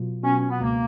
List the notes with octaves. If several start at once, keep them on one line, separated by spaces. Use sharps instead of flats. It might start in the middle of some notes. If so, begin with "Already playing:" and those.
Already playing: B2 F#3 F4
B2 C#4
C#4
B3
C#2 A#3